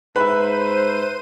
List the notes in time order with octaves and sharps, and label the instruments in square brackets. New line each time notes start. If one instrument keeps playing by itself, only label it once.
[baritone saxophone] G#2 [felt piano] B4 E5 [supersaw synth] C5 D#7 [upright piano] B5